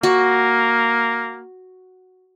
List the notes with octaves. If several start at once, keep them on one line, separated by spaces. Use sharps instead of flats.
A#3 F#4